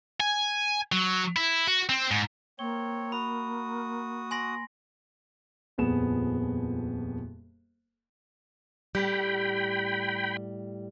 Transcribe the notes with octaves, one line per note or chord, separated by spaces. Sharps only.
G#5
F#3
E4
F#4
C4
G#2
A#3 C4 C#5 G7
F#4 B5 D#6
G#5 C6 A#6
D#1 F2 B3 G#4 E7
A2 G3 G5 B5